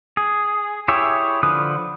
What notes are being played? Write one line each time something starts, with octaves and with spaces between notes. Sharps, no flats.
G#4
E4 G4 G#4 C#5 E5
D3 F3 B4 D#6